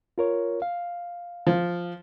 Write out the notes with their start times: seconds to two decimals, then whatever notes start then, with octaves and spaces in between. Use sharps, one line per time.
0.18 F4 A#4 C#5
0.62 F5
1.47 F3